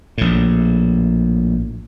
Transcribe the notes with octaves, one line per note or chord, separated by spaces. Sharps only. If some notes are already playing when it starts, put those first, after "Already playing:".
A#1 A2